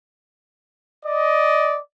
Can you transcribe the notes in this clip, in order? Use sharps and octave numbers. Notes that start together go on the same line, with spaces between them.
D5 D#5